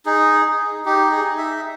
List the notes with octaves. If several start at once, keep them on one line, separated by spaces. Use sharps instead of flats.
D#4 G#4
D#4
D#4 G4
G#4
D#4
E5